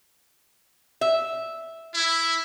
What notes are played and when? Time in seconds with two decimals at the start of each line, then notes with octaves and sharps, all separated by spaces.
1.01 E5
1.94 E4